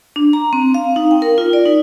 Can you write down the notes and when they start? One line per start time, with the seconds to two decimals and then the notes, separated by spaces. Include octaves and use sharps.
0.16 D4
0.33 A#5
0.53 C4
0.74 F5
0.96 D#4
1.11 G5
1.22 A#4
1.38 F4
1.53 D5
1.66 D#4